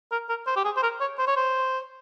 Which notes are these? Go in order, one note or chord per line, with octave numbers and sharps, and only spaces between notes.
A#4
A#4
C5
G4
G#4
C5
A#4
C#5
C5
C#5
C5